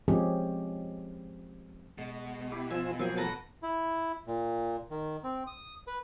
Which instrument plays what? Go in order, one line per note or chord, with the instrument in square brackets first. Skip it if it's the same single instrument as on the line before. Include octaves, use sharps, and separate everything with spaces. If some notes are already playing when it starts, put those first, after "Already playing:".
[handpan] F3 G#3 C4 C#4 G4 G#4
[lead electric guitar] B2 [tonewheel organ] G#3
[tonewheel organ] E4 G4
[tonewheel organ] F3 F4 [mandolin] E5 G#5
[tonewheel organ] F3 F#3 A#3 [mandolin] C4 G#4
[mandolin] A4 B4 A#5
[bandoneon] E4
A#2
D#3
C4
D#6
B4